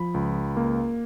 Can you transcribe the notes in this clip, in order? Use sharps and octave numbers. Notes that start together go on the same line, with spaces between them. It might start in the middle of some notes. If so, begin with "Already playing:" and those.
Already playing: F3 B5
C#2
A#3